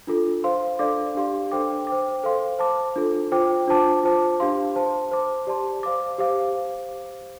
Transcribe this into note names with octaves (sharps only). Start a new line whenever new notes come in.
D4 F4 A4
C5 F5 C6
D4 A4 D5 F5 D6
D4 G4 F5 C6
D4 A4 C5 G5 D6
C5 G5 D6
A4 C5 F5 C6
C5 A5 D6
D4 F4 A4
F4 C5 G5 D6
D4 F4 C5 A5 D6
F4 C5 A5 D6
D4 G4 F5 C6
C5 A5 C6
C5 A5 D6
G4 D5 A5 C6
C5 F5 D6
G4 C5 F5 D6